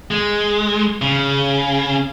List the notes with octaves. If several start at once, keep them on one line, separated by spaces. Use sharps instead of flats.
G#3
C#3